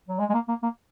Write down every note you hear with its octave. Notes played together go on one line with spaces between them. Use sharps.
F#3
G#3
G#3
A#3
A#3
A#3